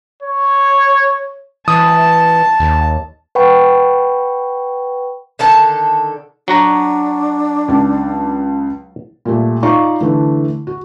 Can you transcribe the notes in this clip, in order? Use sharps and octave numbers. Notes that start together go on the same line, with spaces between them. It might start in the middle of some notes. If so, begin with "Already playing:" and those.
C#5
E3 A5 D#6
D#2
B4 F#5 G5 B5 C#6
D3 D#3 A4 A5
F#3 D4 F#4 A#5
C#2 A5
A#2 G3 A3
D#4 F4 D5 F5 C#6
D3 E3 A3
F#4